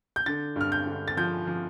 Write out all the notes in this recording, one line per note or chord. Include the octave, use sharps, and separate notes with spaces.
G6
D3 A6
G2 F6
G6
D3
A6
F3 G6
F3